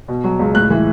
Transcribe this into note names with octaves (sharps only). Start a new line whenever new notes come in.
B2
F#3
C#2
A2 F#6
E3